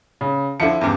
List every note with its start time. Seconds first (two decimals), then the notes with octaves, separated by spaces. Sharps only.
0.21 C#3
0.60 D3 F3 E4 C#7
0.81 E2 G2 C#3